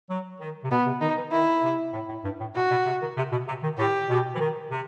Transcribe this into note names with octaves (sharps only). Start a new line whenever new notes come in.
F#3
D#3
C3
B2 B3
C3
D#3 D#4
E3
D#3 E4
C3
A2
A2
G2
A2
B2 F#4
B2
C3
D#3
C3
B2
C3
D#3
A2 G4
B2
E3
D#3
C3